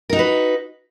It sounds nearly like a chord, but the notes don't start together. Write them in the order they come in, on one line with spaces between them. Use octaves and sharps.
A#4 D#4 F#4 B4